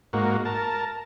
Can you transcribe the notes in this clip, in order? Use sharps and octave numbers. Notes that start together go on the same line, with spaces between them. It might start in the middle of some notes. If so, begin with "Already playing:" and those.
G#2 A#3 F#4
A#4 A5